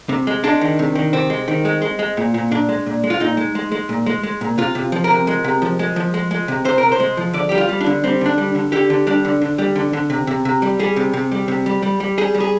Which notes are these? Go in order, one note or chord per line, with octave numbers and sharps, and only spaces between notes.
C3
G#3
G#3 D4
D#3
C3
D#3
C3 C4
G#3
D#3
G#3
G#3
G#3
A#2
A#2
A#2 D4
G#3
A#2
G#3
F4
A#2 D#4
G#3
G#3
G#3
A#2
G#3
G#3
A#2
C3 F4
C3
F3
A#4
C3
G#3
C3
F3
G#3
F3
G#3
G#3
C3
C3 C5
C3 A#4
C5
G#3
F3
D3 D5
G3 G4
F4
G3
D4
D3
G3 C4
D3 D4
G3
D3
D3 G4
D3
G3 D4
D3
D3
G3
D3
D3
C3
C3
C3
G3
G3 G#4
C3
C3
G3
C3
G3
G3
G3
G3 G#4
G3
G#4